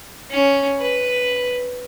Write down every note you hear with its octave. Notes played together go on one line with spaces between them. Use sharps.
C#4
B4